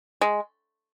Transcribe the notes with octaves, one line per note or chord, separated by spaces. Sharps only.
G#3